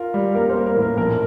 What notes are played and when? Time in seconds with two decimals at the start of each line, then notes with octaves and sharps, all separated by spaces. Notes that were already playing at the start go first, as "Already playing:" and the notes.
Already playing: F4 A#4
0.14 G3
0.34 A#3 A#4
0.50 C5
0.56 A#3
0.66 A#4
0.76 A2
0.82 A#4
0.97 A#1 A#4